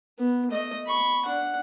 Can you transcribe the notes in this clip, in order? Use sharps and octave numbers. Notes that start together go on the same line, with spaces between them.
B3
A3 D#5
B5 C#6
D4 F#5